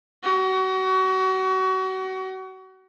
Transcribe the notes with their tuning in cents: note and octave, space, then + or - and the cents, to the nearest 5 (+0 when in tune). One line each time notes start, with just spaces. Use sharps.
F#4 +30